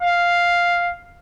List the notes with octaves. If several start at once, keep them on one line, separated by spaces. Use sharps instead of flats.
F5